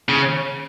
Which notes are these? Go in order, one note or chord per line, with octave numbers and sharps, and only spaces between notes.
C#3